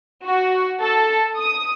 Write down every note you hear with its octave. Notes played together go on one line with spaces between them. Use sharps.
F#4
A4
D#6